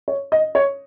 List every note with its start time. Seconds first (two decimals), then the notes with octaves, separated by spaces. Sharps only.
0.08 C#5
0.32 D#5
0.55 C#5